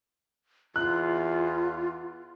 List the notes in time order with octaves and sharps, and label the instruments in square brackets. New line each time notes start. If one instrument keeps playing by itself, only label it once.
[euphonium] E2 [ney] F4 [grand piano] F#6